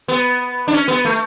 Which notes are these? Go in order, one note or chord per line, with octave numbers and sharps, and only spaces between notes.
B3
D4
C#4
B3
A3